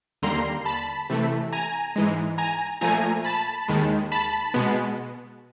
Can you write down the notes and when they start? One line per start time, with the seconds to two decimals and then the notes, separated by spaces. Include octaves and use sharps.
0.22 D#2 D3 G3 A#3 A#5 C6
0.65 A5 B5
1.10 C3 E3 A3
1.53 G#5 A#5
1.96 G#2 E3 G#3
2.38 G#5 A#5
2.81 A#2 F3 A3 G#5 A#5
3.25 A5 B5
3.68 D#2 D#3 G#3
4.12 A5 B5
4.54 B2 G#3 B3